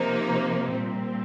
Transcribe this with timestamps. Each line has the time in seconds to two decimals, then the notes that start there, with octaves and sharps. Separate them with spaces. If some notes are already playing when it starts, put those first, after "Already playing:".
Already playing: C3 F3 A#3 D#4
0.71 A#2 G3 C4